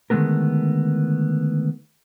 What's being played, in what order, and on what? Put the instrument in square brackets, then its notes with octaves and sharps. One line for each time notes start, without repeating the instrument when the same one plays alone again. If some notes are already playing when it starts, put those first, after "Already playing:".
[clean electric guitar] D3 D#3 G#3 A3 B3 A#4